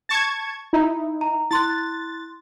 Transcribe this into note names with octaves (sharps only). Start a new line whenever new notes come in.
A5 C#6 G#6
D#4 E4
A#5
E4 C6 F#6 A6